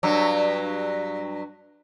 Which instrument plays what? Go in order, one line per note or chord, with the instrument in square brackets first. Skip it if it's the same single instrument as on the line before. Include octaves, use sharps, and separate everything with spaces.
[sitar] G2 F#3